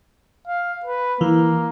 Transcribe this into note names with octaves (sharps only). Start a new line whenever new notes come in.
F5
B4
E3 A#3